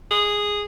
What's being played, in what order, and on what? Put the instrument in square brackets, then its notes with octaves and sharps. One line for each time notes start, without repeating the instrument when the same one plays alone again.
[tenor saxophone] G#4